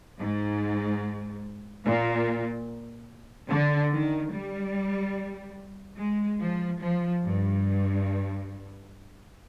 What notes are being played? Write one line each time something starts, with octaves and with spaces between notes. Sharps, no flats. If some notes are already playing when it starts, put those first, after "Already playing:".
G#2
A#2
D3
D#3
G3
G#3
F3
F3
G2